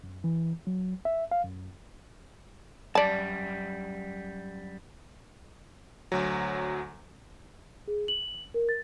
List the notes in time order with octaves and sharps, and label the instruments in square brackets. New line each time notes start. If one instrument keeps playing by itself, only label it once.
[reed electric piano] F#2
E3
F#3
E5
F5
F#2
[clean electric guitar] F#2 G3 [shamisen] D5 A5
[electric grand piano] D2 F#3
[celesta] G#4
F#7
A#4
A6